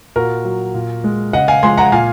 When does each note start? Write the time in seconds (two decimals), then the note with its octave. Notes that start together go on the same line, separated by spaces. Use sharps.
0.16 A#2 F#4 A#4
0.45 F#3
0.74 A#2
1.04 G#3
1.33 C#3 D#5 F#5
1.48 F5 G#5
1.63 F3 G#3 G#5 C6
1.78 F#5 A#5
1.92 A#2 F5 G#5